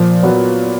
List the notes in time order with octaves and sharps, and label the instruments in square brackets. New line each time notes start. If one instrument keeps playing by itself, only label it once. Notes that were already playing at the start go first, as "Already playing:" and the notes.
Already playing: [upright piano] A#2 [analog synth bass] F3
[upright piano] F#3 B3 F#4